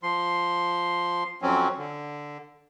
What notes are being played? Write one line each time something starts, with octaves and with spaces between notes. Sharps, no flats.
F3 C6
F2 F#3 C4 C#4
D3